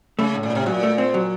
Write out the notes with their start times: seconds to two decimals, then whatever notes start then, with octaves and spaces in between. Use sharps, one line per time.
0.19 C#3 A3
0.34 A2
0.43 A#2
0.50 A2
0.55 C3
0.66 A#2 F#3
0.83 A3
0.98 C4
1.14 F#3